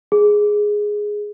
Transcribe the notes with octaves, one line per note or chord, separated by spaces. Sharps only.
G#4